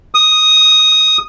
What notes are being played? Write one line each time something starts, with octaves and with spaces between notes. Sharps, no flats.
D#6